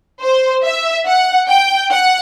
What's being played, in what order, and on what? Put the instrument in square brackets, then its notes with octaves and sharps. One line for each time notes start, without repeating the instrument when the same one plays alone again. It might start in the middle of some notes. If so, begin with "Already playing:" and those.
[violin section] C5
E5
F#5
G5
F#5